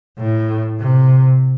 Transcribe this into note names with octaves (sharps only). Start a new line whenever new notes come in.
A2
C3